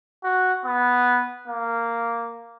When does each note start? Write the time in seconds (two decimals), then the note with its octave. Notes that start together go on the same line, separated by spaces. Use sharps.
0.24 F#4
0.65 B3
1.48 A#3